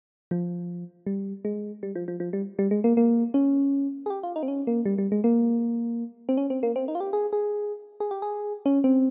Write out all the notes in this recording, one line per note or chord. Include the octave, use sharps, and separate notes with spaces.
F3
G3
G#3
G3
F3
F3
F3
G3
G3
G#3
A#3
A#3
C#4
G#4
G4
F4
D#4
C4
C#4
A#3
G3
G3
G#3
A#3
C4
C#4
C4
A#3
C4
D#4
F4
G4
G#4
G#4
G#4
G4
G#4
C#4
C4